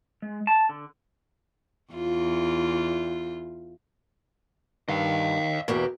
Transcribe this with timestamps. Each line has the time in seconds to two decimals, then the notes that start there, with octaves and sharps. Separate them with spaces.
0.22 G#3
0.47 A5
0.69 D3
1.93 E2 F4
4.89 G2 D#3 D#5 F5
5.68 E2 B2 A#3 G4